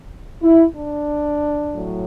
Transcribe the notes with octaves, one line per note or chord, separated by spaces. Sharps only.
E4
D4
A2 F#3